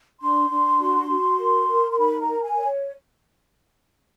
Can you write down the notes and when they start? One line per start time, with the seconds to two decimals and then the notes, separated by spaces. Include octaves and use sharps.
0.21 D4 C6
0.50 D4
0.80 F#4
1.09 F#4
1.39 A#4
1.68 A#4
1.92 C6
1.98 D#4 B5
2.20 A#5
2.28 A#4
2.42 G#5
2.56 C#5